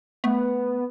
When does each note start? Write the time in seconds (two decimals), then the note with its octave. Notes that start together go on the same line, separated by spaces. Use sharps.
0.24 A3 B3